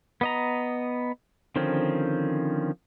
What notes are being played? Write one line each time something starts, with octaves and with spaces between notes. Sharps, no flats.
B3 D#5 A#5
D3 D#3 F3 C4 C#4